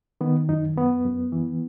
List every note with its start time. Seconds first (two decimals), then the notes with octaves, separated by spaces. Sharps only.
0.21 D#3 B3
0.49 F#2 D#4
0.76 F#2 B3
1.05 F#2
1.32 E3